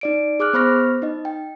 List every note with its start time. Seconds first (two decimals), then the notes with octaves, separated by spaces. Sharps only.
0.01 D#4 D5 D7
0.40 G#4 D6 F6 F#6
0.53 B3 C5 B5 C#6 F6 A#6
1.02 D#4 D#5
1.25 G5